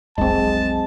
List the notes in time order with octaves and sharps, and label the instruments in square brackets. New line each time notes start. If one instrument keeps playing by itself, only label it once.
[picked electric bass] F1 [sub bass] B1 [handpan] G#3 C4 [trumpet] A5